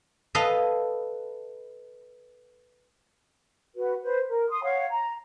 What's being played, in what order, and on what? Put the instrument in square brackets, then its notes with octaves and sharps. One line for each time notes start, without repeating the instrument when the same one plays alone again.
[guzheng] A4 B4 D#5 F5
[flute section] F#4 B4
B4 C5
A#4
C6 D#6
C#5 F5 F#5
A#5